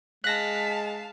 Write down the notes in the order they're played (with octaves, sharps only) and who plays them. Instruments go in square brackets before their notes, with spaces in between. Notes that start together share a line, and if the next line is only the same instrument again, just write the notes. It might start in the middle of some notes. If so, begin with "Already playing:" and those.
[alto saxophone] G#3 [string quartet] F5 A5 [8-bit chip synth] F#6 A#6 [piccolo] B6